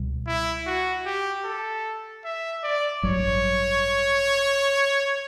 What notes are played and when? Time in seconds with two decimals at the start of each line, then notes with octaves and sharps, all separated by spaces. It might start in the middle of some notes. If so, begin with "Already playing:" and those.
Already playing: C#2 B2 G3
0.27 E4
0.66 F#4
1.06 G4
1.45 A4
2.25 E5
2.64 D5
3.03 A1 G2 F#3 C#5